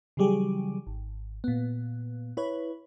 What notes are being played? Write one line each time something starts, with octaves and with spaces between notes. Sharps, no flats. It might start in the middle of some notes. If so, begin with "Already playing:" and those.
C#3 E3 F#3 G3 G4 G#4
G#1
A#2 B3
E4 B4 C#5